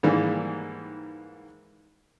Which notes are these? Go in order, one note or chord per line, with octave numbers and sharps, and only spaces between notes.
G#2 D#3 E3 G3 A#3